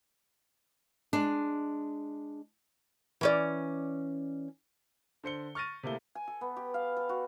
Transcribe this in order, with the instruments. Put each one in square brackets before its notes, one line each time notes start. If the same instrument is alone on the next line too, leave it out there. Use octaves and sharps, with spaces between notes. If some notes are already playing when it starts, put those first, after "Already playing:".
[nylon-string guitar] G#3 D4
[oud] E3 C#4 D5
[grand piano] D3 C5 C#7 G7
C#6 F6 A6 A#6 D#7
C3 A3 A#3 E4 G7
[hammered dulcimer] G#5
A4
B3
G4
F5
A4
F#4